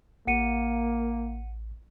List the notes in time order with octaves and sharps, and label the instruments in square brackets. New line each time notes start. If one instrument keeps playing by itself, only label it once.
[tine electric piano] A1 [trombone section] A#3 [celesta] F#5 C#7 D#7